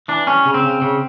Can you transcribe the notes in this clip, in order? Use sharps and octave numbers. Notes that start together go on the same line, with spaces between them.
E3 D4
G3 C#4
C#3
C4
C#3
C#3